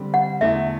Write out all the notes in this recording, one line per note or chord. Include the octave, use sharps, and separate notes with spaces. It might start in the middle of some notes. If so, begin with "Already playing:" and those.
Already playing: D3 G3 C4
F#5
E2 D3 A3 E5